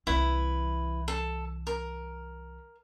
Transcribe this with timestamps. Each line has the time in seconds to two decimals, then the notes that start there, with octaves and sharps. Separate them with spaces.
0.07 C2 E3 E4 B4
1.08 A4
1.67 A#4